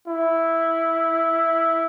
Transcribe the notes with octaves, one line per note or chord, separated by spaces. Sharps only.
E4